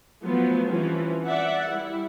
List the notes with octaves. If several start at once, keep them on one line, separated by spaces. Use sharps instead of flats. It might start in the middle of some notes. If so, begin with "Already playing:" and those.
F3 F#3 A3 B3
E3 F3 G3 C4 C#4
D5 E5 F#5
G3 E4